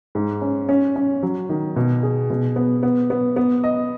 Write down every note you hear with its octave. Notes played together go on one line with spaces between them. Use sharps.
G#2
C#4
C#4
C#4
F#3
D#3
B2
G#4
B2
B3
B3
B3
B3
D#5